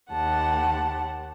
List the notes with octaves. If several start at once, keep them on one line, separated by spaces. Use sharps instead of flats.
D#2 G4 F#5 A5